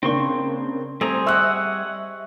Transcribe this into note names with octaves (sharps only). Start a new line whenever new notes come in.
C#3 A#3 C4 D4 C6 C#6
G3 A3 C4 G#4 A#5
D#5 E5 F#5 C#6 E6